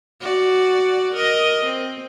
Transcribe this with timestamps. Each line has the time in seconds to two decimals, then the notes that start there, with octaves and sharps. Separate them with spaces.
0.21 F#4 D5
1.14 A#4 D#5
1.65 C4